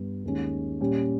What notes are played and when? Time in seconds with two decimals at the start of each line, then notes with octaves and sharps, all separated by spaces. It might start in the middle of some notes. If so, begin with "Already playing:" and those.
Already playing: G2 G3 B3
0.24 D#2 D#3 G#3 C#4
0.81 A#2 G3 C#4 G4